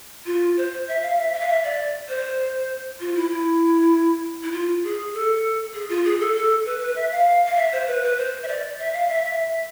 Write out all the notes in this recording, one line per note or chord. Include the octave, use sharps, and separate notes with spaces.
F4
C5
E5
F5
E5
E5
F5
E5
D5
C5
F4
E4
E4
E4
F4
G#4
A4
G#4
F4
G#4
A4
A4
B4
B4
E5
F5
F5
E5
C5
B4
B4
C5
E5
D5
E5
F5
E5
E5